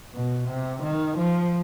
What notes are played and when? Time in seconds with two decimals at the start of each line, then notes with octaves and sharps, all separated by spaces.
0.15 B2
0.49 C3
0.83 D#3
1.18 F3